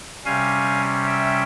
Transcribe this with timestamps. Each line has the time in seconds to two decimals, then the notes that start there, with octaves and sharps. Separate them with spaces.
0.25 C3 G3 C#4 F5 G#5
1.06 E5 G5